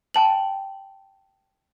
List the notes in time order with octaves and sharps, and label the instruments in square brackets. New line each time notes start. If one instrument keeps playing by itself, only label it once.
[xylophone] G5 A5 F#7